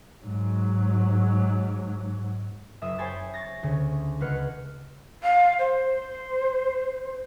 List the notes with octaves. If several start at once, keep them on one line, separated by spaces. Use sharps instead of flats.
G#2 F#3
F#1 E5 D#6
C5 C#5 G5 G#5 B5 A6
C#6 A6 A#6
D2 C#3
C#2 B4 F#5 F6 C#7
F5
C5